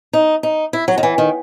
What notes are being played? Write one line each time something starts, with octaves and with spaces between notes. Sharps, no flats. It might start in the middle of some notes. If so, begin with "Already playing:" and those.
D#4
D#4
E4
F#3
D#3
E3
D#3